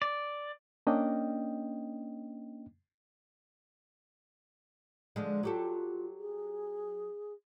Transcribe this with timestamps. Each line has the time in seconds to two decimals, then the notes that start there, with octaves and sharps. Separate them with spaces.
0.02 D5
0.87 A#3 C#4 D4 D#5 G5
5.16 D3 F3 G#3
5.43 F#3 F4 G4 A4
6.18 G#4